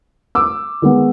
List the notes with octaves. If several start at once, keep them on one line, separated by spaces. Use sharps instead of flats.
D6 E6
D#3 G#3 B3